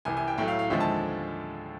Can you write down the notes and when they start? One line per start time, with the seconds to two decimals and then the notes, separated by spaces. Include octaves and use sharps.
0.05 C2 C3 E3 G#5
0.17 G#5
0.28 G5
0.38 A2 F#3 A3 G5
0.48 F5
0.59 F5
0.70 D#2 D3 F3 G#3 E5
0.80 A5